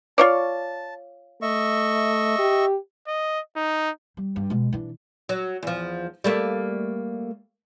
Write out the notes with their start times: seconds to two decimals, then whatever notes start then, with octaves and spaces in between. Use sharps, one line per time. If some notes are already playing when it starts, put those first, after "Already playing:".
0.18 F4 C#5 D5 A5
1.42 A3 D#5 E5 C#6
2.39 G4
3.07 D#5
3.56 D#4
4.17 G3
4.36 G2
4.50 B2 G#3
4.73 E3 D4
5.29 F#3
5.63 E2 F3
6.24 G3 A3 A#3